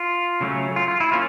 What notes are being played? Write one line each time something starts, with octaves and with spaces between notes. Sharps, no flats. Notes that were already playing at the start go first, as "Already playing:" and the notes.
Already playing: F4
C#3 F#3 A3 C#4
F4
F4
E4
A#3 C#4 F4